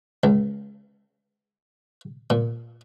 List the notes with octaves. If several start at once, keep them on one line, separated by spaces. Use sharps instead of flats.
C#2
A#2